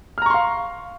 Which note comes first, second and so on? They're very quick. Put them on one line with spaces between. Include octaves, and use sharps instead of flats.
F6 A#5 C#6 C6 F5